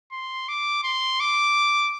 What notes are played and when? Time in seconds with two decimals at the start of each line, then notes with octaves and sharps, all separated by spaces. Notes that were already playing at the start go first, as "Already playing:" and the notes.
0.12 C6
0.48 D6
0.83 C6
1.20 D6